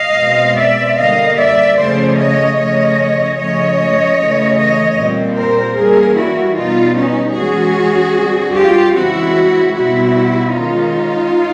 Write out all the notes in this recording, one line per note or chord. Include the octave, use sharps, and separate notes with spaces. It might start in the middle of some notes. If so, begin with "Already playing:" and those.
Already playing: D#5 F5
B2 G#3 C4
D5 E5
D3 G3 A#3 D#5 F5
D5 E5
C#3 F3 A3 C#4 C5 D5
C#5 D#5
C#3 F3 A3 C#4 C#5 D#5
C#3 F3 A3 C#4 C#5 D#5
C#3 E3 A3
C#5 D#5
A#2 G3 C4
A#4 C5
E3 G3 A#3 C#4 G#4 A#4
E4 F#4
B2 G3 B3 D#4 F4
C#4 D#4
E3 G#3 C#4 F#4 G#4
D3 G3 C4
F4 G4
C#3 E3 G#3 C4 E4 F#4
B2 G3 C4 E4 F#4
D#3 G#3 C#4 D#4 F4